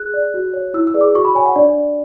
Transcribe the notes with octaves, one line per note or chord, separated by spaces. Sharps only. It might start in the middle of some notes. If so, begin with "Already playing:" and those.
Already playing: G#4 F#6
D5
F#4
C#5
E4 E6
E6
G#4 B4 D5
D6
F#4 C#6
B5
C#5 G#5
F#5
D4 D5